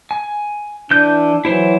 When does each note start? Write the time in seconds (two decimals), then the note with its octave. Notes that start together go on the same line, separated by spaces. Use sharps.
0.11 G#5
0.91 E3 D4 G6
1.45 E3 F#3 E4 C5